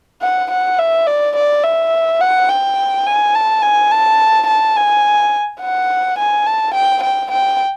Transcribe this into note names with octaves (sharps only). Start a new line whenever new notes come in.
F#5
F#5
E5
D5
D5
E5
F#5
G5
G#5
A5
G#5
A5
A5
G#5
F#5
G#5
A5
G5
G5
G5